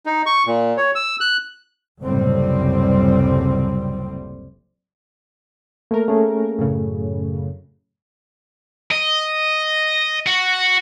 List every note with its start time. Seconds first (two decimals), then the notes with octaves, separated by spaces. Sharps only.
0.06 D#4
0.26 C#6
0.46 A#2
0.77 C#5
0.95 E6
1.20 F#6
2.02 F#1 C#2 A2 C3 G3 C4
5.91 A3 A#3 A#4
6.08 A3 C#4 G#4
6.59 F#2 A2 C#3
8.91 D#5
10.27 F#4